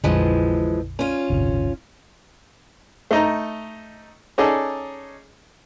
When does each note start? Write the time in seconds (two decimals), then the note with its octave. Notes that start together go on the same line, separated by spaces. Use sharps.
0.04 A#1 F2 D3 E3 F3 G#3
0.99 C#4 F4
1.30 D1 G1 C3
3.11 A3 D#4 A#5
4.38 C#4 D#4 G#4 A4 D5